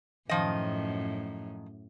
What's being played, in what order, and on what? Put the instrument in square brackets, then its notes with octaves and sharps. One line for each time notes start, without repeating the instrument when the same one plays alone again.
[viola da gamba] F#2 A2 [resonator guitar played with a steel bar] D#3 F3 D#5